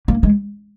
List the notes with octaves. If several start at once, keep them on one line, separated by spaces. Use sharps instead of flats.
A#3
G#3